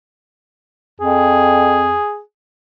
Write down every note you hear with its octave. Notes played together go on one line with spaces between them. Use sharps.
F2 G#4